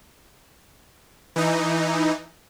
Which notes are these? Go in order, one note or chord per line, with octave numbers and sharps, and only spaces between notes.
E3 D#4